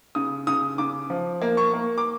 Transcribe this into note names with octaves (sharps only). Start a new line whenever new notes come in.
C#3 D#6
C#3 D#6
C#3 D6
F3
A#3
C#6
A#3
D6